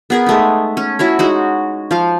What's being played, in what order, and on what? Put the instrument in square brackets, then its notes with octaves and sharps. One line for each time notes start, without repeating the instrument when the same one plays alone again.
[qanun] B3 G#4 A#4
G#3 A3 D#4
C#4
E4 F#4 C#5
G#3 D#4 F#4
F3 F5